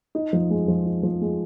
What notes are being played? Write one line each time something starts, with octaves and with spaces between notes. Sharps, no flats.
D#4
F3
G#3
F3
D#4
F3
G#3